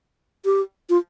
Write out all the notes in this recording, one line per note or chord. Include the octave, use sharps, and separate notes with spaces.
G4
F4